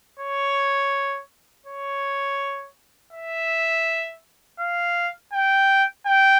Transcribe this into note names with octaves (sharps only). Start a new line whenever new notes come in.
C#5
C#5
E5
F5
G5
G5